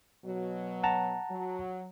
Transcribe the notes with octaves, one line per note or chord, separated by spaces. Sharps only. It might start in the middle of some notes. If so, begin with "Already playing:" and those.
B2 F#3
F#5 A5 A#5
F#3